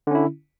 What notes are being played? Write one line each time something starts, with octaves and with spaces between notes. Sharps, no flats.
D3 C#4 E4